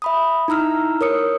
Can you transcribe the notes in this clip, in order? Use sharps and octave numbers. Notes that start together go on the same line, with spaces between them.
E5 B5 D#6
D#4 E4 A#5 E6 F6
A#4 C#5 D#6 C#7